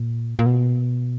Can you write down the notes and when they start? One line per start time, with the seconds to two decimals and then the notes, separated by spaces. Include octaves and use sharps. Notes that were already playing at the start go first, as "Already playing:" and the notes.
Already playing: A#2
0.39 A#2
0.46 B2